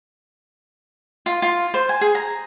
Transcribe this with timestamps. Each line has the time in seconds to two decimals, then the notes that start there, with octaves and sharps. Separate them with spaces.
1.26 F4
1.42 F4
1.74 C5
1.89 G#5
2.01 G#4
2.15 A#5